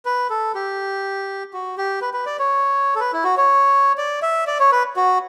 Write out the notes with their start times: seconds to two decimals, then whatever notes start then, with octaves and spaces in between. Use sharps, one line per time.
0.05 B4
0.30 A4
0.55 G4
1.53 F#4
1.78 G4
2.01 B4
2.14 B4
2.26 D5
2.39 C#5
2.95 A4
3.00 B4
3.13 E4
3.24 F#4
3.37 C#5
3.98 D5
4.22 E5
4.47 D5
4.60 C#5
4.72 B4
4.96 F#4